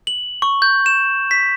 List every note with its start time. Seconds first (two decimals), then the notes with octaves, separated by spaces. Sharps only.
0.07 F#7
0.42 C#6
0.62 G6
0.86 E7
1.31 B6